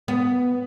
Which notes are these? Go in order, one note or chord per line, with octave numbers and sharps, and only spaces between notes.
B3